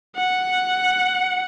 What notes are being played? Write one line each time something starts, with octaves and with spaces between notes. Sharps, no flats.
F#5